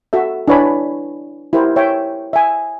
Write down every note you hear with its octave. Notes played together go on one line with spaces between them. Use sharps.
F#4 A4 E5
D4 E4 B4 C#5 G#5 B5
E4 G4 A#4 C5
C#5 E5 G5
E5 G#5